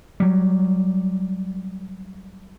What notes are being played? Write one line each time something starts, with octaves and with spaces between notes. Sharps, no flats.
F#3 G3